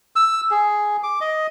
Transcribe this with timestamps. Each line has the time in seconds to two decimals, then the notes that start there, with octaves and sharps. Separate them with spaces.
0.16 E6
0.51 G#4
1.03 D6
1.21 D#5